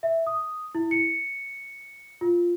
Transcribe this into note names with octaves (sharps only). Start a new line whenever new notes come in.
E5
D#6
E4
C#7
F4